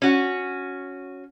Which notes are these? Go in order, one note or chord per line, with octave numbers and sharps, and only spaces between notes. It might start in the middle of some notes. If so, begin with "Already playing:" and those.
C#4 F#4